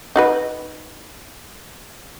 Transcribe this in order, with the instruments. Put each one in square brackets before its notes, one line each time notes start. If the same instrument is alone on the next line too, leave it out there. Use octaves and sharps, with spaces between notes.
[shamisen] D#4 F#4 B4